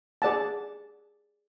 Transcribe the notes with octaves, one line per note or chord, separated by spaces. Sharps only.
G#4 D5 F#5 A5